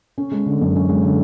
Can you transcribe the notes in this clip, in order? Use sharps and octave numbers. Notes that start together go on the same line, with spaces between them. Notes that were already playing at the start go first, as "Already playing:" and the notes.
C#4
G#3
D3
F#2
C#4
G#3
D3